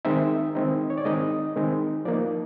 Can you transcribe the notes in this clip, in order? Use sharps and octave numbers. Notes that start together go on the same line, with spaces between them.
D#3 G#3 C4 D#4 E5
D#3 G#3 C4 D#4
C#5
D5
D#3 G#3 C4 D#4 D#5
D#3 G#3 C4 D#4
F3 A#3 D#4 D5